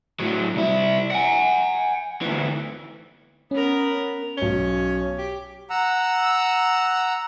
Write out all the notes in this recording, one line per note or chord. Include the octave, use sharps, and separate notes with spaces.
A2 F#3
C2 E4
F#5 G#5
D2 E3
B3 C#4 A#4
B1 C#4 G7
G4
F#5 A#5 E6